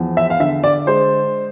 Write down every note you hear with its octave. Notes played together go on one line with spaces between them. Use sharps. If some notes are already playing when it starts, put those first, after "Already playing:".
Already playing: E2 F3
E5
F5
D3 E5
D5
G#3 C5